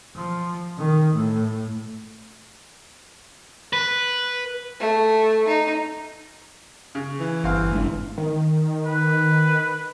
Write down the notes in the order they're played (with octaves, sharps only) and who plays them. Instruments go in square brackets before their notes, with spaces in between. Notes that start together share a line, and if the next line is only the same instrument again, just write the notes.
[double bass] F3
D#3
A2
[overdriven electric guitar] B4
[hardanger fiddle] A3
D#4
[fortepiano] C#3
[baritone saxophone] E3
[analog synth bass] G1 [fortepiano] C4 F5
[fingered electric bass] A1 G#2 D4
[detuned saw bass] D#3
[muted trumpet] B4